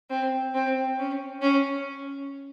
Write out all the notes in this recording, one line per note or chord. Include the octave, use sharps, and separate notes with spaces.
C4
C4
C#4
C#4